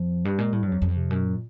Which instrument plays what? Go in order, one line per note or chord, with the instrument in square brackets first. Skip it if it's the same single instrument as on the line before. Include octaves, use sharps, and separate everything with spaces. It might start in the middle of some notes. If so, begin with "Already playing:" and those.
Already playing: [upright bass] F2 [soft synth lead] F3
[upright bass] G2 [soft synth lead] G3
[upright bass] A#2 [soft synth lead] G#3
[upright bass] A2 [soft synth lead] G3
[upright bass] G2
[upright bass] F2 [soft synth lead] F#3
[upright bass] F2
[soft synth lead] C3
[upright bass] F#2 [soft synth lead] B2
[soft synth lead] A#2